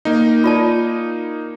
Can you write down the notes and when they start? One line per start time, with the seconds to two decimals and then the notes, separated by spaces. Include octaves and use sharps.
0.05 A#3 D#4
0.44 F4 D5 A5